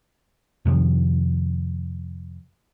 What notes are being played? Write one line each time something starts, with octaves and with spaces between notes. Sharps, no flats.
F2 C3 D#3 F3